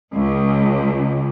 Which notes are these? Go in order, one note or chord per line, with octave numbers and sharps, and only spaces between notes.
C#2